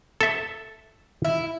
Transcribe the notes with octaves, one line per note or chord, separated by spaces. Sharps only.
A4 E5
E4